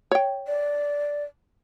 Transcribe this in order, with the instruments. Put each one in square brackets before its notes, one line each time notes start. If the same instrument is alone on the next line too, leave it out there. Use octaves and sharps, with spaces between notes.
[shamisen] C#5 G5
[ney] D5